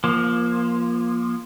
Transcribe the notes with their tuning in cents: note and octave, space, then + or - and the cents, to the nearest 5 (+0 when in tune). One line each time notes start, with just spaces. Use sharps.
F3 +0 A#3 +20